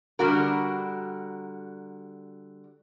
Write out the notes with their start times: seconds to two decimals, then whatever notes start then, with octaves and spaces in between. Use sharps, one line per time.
0.19 D3 G3 F#4 A#4